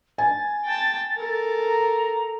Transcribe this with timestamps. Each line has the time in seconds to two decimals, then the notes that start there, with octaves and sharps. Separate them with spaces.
0.18 G#5 A6
0.65 G5 A5
1.17 A4 A#4
1.66 A#5